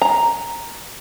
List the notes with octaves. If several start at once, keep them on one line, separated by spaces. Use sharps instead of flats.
A#5